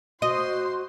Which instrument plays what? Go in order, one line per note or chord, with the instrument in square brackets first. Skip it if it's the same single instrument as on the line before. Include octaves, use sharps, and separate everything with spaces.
[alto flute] F#4 [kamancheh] C5 C6 [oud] D#5